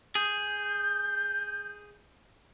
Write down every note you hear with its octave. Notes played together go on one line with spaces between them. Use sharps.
G#4 G6